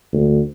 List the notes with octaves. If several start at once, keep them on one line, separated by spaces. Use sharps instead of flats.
D2